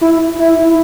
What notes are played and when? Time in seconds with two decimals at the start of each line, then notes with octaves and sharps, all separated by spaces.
0.01 E4
0.39 E4
0.58 E4